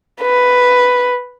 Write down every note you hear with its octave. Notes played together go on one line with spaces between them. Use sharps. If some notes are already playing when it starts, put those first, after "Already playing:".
B4